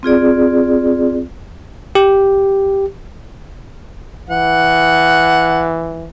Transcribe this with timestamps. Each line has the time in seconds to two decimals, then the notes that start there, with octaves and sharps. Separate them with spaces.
0.03 C4 F4 G#4 D5
1.95 G4
4.30 E3 F#5